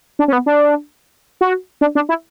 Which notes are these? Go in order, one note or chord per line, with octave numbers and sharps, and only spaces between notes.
D4
C#4
B3
D4
F#4
D4
D4
E4